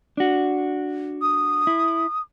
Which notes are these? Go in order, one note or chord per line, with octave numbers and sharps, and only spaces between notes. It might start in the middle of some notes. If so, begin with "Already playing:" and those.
D4 F#4
D#6
E4